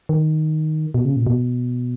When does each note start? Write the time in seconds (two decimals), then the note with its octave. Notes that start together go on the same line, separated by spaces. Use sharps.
0.09 D#3
0.94 B2
1.05 C#3
1.16 A#2
1.27 B2